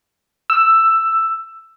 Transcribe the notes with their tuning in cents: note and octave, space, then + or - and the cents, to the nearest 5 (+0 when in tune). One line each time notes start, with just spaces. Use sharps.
E6 +10